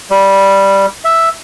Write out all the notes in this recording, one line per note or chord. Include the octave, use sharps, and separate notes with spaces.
G3
E5